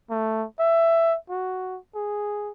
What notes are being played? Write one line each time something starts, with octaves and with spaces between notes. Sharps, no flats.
A3
E5
F#4
G#4